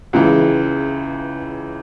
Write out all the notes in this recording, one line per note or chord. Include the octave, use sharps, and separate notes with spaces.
C#2 C#3 E3